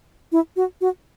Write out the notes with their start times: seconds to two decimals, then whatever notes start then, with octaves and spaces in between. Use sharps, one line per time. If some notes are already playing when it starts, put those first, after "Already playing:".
0.32 E4
0.56 F#4
0.81 F#4